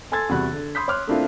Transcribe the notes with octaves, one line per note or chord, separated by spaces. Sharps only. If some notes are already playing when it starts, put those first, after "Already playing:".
A4 G#5 C6 E6 G#6 A6
E2 C3 G3 F#4 B5 F#6
D3
B5 C6 D#6 G6 B6
C#5 C6 D6 F6 F#6
A3 A#3 C4 D4 E4 F4